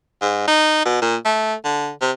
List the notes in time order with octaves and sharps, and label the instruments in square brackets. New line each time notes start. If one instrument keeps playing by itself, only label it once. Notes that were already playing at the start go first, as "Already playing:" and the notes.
[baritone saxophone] G#2
D#4
B2
A#2
A3
D3
C3